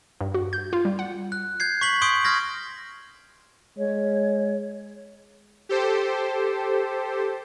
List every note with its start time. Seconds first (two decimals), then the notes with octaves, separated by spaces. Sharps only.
0.21 G2
0.34 F#4
0.53 G6
0.73 F4
0.85 G3
0.99 F#5
1.32 F#6
1.60 G6 G#6 C7
1.81 C#6 B6 F#7
2.02 C6 C#6 D#6 G6 D7
2.25 C#6 F6 G#6 A#6
3.78 G#3 C#5
5.69 G4 A4 C5